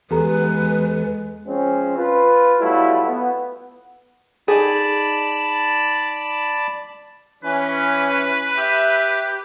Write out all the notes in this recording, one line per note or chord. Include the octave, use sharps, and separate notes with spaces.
E2 G#3 G4 A4 B4 A#5
F3 G#3 C4 C#4
F4 B4
F#3 G3 A3 B3 E4 F4
B3
D#4 G#4 D5 A5 B5
E3 C#4 B4
G4 E5